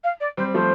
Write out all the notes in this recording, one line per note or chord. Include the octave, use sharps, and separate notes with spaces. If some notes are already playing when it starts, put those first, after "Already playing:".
F5
D5
G3 C4 C5
F3 A3 C5